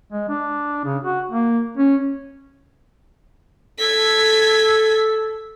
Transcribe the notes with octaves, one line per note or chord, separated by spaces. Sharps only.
G#3
D4
C#3
F#4
A#3
C#4
A4 G#6 B6